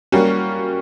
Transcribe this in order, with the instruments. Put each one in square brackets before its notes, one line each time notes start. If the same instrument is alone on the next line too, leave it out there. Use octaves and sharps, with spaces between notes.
[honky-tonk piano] G3 A#3 C#4 F#4